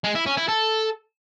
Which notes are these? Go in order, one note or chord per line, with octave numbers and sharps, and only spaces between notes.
G#3
E4
C#4
E4
A4